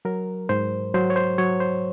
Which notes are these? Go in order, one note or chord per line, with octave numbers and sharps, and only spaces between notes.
F#3 A#4
G#2 C5
F#3 C5
C#5
C5
F#3 C#5
C5